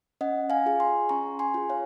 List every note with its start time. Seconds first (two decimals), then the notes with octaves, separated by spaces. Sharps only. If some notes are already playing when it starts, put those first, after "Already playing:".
0.21 C#4 D#5 F#5
0.50 F5 G#5
0.66 F4 G#4
0.80 G#5 C6
1.09 C#4 A#5 C#6
1.39 G#5 C6
1.54 F4 G#4
1.69 C#5 F5